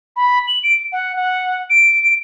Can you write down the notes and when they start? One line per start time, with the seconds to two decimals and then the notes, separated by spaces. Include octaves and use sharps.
0.16 B5
0.47 F#7
0.63 D7
0.92 F#5
1.16 F#5
1.70 D7